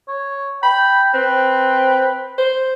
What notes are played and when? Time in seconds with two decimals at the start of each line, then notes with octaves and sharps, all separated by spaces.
0.08 C#5
0.63 G5 B5
1.14 C4 B4
2.38 C5